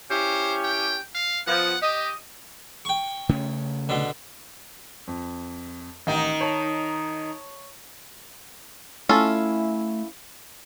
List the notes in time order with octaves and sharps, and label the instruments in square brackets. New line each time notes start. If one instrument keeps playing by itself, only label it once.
[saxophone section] C#4 E4 G4 [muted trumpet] C5
[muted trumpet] G5
F5
[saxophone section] F3 B3 [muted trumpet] F#5
[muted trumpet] G4 [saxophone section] D#5
[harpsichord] G5 C#6
[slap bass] C#3 A3 C#4
[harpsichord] B2 D3
[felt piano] F2
[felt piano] A1 [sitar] D#3 D#4
[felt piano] C#5 A5
[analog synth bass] A3 [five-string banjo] C#4 F4 A4 [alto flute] E4